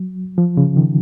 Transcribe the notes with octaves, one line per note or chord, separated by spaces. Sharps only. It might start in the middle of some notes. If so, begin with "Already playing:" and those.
Already playing: F#3
F3
C#3
D#3